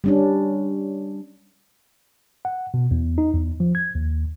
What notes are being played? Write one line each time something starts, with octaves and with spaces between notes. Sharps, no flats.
G3 C#4 D4
F#5
B2
E2
D#4
E2
F3
G#6
D#2